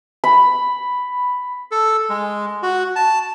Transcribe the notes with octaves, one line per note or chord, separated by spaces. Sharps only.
B5
A4
G#3
F#4
A5